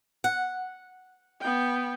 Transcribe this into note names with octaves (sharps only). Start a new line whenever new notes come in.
F#5
B3 G5